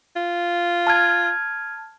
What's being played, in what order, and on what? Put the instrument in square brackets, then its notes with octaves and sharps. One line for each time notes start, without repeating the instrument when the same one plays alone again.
[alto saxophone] F4
[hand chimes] A5 F6 G#6